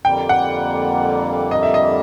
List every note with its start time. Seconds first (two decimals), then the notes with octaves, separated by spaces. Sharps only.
0.04 F2 D3 G3 A#3 G5
0.29 F#5
1.51 D#5
1.63 E5
1.74 D#5